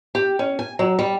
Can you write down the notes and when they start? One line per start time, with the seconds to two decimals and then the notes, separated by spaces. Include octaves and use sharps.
0.15 G4
0.39 C#4
0.59 G#5
0.79 F#3
0.99 G3